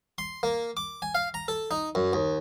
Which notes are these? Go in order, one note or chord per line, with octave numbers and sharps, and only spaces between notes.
C6
A#3
D6
G#5
F5
A#5
A4
D#4
F#2
D#2